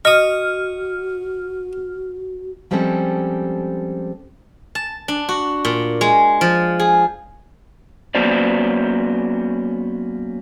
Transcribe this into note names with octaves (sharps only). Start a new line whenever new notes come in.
F#4 D#5 C#6 D#6 F6
F3 G3 G#3 C4 C#4 A4
A5
D4
F#4
A#2
G#3
F3
G#4
F#3 A#3 B3 C#4 C5 D5